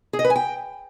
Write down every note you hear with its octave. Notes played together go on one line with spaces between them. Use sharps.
G#4
D#5
B4
G#5
G5